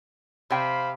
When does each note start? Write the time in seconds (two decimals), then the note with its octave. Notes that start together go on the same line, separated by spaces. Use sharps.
0.50 C3 C5 F5 G5 B5